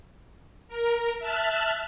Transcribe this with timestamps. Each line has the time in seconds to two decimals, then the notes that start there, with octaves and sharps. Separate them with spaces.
0.68 A#4
1.19 E5 A5 F6 F#6